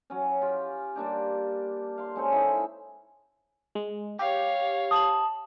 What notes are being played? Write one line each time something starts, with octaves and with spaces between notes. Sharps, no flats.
F#3 C#4
F4 G4
G3 A#3 D4 G4
F5 C6
G#3 C#4 A4 C5
D#4 E4
G#3
G4 C#5 F5
A5 D#6 F#7